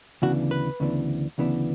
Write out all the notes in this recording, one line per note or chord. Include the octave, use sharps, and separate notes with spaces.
D2 C#3 E3 B3 D4 F#4
B4
D2 C#3 E3 B3 D4
D2 C#3 E3 B3 D4